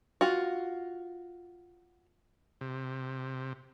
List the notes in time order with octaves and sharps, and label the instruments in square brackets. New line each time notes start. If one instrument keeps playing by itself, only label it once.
[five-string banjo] F4 F#4
[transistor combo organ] C3